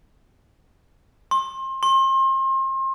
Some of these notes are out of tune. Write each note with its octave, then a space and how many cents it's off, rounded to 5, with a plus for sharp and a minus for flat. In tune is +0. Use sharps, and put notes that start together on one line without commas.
C6 +30
C6 +35